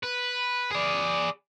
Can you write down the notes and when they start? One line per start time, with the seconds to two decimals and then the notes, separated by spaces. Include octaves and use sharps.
0.04 B4
0.71 G#4 D5